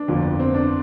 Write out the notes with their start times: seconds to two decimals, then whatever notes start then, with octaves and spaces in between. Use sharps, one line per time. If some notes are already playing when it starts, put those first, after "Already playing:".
Already playing: D4
0.08 G1 F2 D3 F3 A#3
0.39 C4
0.54 D4